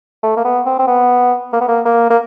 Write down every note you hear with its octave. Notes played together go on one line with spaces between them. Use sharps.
A3
A#3
B3
C4
C4
B3
A#3
B3
A#3
A#3
A#3